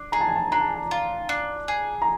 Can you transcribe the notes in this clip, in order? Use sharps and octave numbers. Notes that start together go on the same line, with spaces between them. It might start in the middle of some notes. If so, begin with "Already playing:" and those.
Already playing: D4
G#4 A#5
A5
G#5
A5
D4 A#5
A5
G#5
A5
F4
D4
G#4
A#5